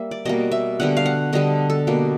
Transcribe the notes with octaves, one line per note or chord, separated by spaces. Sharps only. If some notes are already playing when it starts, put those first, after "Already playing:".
Already playing: G3 A#3 E5
D5
B2 G3 A#3 D#5
E5
D3 G3 B3 F#5
F5
F#5
D3 G3 B3 D#5
A4
B2 G3 A#3